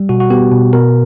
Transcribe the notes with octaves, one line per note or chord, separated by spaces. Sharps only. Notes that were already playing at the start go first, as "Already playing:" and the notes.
Already playing: G3
B2 F#4
F#4
B3 G4
B2
B2 A#4